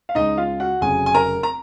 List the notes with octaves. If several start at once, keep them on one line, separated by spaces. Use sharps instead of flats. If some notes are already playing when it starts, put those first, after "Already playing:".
F5
C#2 C#3 G#3 D#4 D#5
F4 F5
F#4 F#5
F1 F2 C#3 F#3 G#4 G#5
G#5
A#4 A#5
A#5